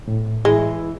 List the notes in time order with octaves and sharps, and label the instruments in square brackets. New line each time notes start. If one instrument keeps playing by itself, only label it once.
[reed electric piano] A2
[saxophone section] E3 E4 [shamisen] G#3